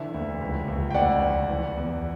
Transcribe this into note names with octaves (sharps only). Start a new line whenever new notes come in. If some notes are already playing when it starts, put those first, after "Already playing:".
Already playing: D3 E3 E5
D2
C#2
C#2
G5
D2 D5 F#5
D2
E3
E2